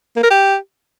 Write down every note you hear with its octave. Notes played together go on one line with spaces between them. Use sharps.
A#3
A#4
G4